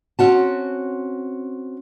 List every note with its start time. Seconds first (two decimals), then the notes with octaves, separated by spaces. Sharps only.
0.19 C4 C#4 F#4 A5